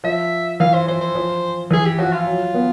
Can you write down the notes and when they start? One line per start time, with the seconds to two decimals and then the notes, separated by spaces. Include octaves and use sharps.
0.04 F3 E5
0.60 E3 F5
0.74 C5
0.87 F3 C5
1.01 C5
1.15 F3
1.71 E3 G#4
1.85 G4
1.99 F3 F#4
2.12 F4
2.27 F#3
2.54 B3